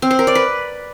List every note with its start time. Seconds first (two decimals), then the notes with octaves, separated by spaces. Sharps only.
0.02 C4
0.11 C5
0.19 A#4
0.27 D5
0.35 B4